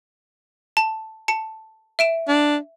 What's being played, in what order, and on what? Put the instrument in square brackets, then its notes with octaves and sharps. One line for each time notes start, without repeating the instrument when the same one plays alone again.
[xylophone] A5
A5 C#7
E5 D7 E7
[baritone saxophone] D4